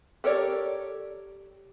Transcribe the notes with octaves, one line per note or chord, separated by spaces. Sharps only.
G4 A4 A#4 C#5 D5